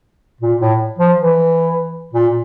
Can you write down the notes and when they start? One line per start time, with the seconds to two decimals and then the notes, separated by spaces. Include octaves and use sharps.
0.41 A#2
0.60 A2
0.99 F3
1.18 E3
2.13 A#2